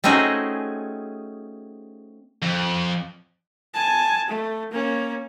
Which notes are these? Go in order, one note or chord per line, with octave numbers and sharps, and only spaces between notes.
A3 C4 C#4 D#4 F#4 G#4
F2
G#5 A5
A3
A#3 C#4